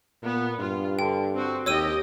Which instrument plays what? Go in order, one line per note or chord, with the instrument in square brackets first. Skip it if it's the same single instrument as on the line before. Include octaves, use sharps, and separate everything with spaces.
[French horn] A#2 [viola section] B3
[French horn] G2 [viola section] F4
[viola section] D3 [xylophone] G5
[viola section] C4 F#4
[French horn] D#2 [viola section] G4 D#5 G5 [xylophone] C#5 E6 D#7